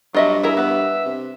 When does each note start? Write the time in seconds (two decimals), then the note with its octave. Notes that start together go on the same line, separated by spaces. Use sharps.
0.14 G2 F#3 F4 D#5 E5
0.43 E4 G#4 A#4 E5
0.57 B3 B4
1.06 C3